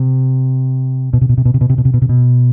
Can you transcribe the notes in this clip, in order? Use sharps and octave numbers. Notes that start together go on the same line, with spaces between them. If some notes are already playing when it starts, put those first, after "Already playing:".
Already playing: C3
B2
C3
B2
C3
B2
C3
B2
C3
B2
C3
B2
C3
B2